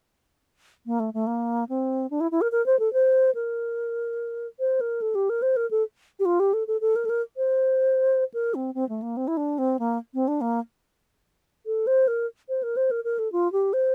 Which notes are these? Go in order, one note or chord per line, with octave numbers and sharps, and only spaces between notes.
A#3
A3
A3
A#3
C4
D4
E4
E4
A#4
A#4
C5
A4
C5
A#4
C5
A#4
A4
G4
A#4
C5
A#4
A4
G4
F4
G4
A4
A4
A4
A#4
A4
A#4
C5
A#4
C4
C4
A3
A#3
C4
E4
D4
C4
A#3
C4
D4
A#3
A4
C5
A#4
C5
A#4
C5
A#4
A#4
A4
F4
G4
C5